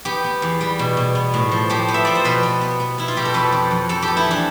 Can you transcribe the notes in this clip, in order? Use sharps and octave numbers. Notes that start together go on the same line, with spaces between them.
B3 G4
B3
E2
G3
B2
B2
B3
A2
F3
F3 G4
B3
E5
F3 D5
C5
B2 B4
B3
B3
B3
B3 E4
F4
B2 G4
A4
F2 B4
F2
F2
F2 A4
G4
B3
E4
E3 D4